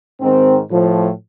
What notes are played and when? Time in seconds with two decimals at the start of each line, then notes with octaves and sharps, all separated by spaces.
0.20 G#2 D#3 C4
0.69 A2 F3